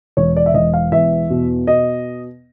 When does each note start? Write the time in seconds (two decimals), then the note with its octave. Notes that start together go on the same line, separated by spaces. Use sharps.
0.17 E1 C#5
0.36 D5
0.46 E5
0.54 E1 D#5
0.74 F5
0.92 E2 E5
1.30 B2
1.67 B2 D#5